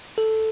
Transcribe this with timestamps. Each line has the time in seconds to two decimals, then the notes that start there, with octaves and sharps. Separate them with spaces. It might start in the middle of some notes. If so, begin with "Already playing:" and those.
0.18 A4